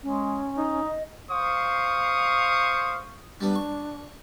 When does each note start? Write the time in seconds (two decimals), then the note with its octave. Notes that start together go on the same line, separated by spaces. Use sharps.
0.03 G#3 C#4
0.57 D#4
0.84 D#5
1.31 C5 F5 C#6 D#6
3.41 G3 B3 D4
3.55 C#6